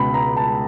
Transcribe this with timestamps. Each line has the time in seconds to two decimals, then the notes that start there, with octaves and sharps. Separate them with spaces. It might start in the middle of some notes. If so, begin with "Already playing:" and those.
Already playing: C#2 B2 B5
0.14 A#5
0.37 A5